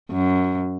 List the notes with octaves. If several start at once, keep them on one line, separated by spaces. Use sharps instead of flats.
F#2